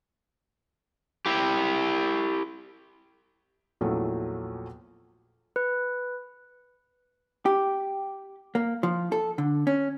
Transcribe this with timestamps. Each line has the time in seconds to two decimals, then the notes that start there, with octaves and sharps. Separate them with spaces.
1.26 E4 G4
3.81 A#1 E2 F3 F#3 A3
5.56 B4
7.46 G4
8.55 A#3
8.83 F3
9.12 A4
9.38 D3
9.67 C#4